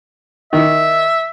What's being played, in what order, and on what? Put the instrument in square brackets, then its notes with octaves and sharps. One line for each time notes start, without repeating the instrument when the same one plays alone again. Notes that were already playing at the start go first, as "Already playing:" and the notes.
[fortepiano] D#3 [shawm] E5